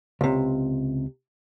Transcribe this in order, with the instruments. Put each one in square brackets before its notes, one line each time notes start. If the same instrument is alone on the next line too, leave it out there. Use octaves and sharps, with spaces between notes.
[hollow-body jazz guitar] C#2 C3